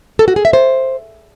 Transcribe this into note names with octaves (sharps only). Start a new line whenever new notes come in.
A4
F#4
G#4
E5
C5